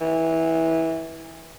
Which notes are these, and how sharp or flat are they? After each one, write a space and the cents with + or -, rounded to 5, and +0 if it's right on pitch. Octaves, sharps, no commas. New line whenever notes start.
E3 -20